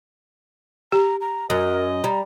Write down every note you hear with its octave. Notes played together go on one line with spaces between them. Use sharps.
G4 A#5
A#5
F#2 A#4 D#5
G3 A#5